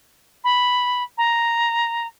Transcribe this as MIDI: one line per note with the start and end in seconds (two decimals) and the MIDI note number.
0.44 1.03 83
1.18 2.07 82